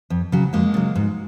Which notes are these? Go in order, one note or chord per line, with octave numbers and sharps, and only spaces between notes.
F2
C#3 F#3
F2 G#3 A#3
C#3 F#3
G#2